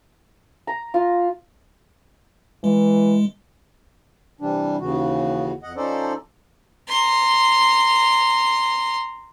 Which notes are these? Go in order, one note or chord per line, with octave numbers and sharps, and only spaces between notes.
A#5
F4
E3 G#3
C3 E3 G3 D4
D#2 C#3 E3 F#4
F2 D#5 F#5
F3 C#4 D#4 A4 C5 D5
A#5 C6